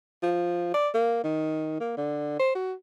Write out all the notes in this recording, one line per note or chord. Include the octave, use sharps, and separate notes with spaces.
F3
D5
A#3
D#3
A#3
D3
C5
F#4